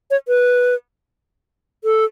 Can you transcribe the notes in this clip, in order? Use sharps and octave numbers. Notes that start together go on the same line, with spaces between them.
C#5
B4
A4